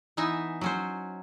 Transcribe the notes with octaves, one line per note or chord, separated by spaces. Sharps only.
E3 B3 D#4 E5 G#5
F#3 C#4 C5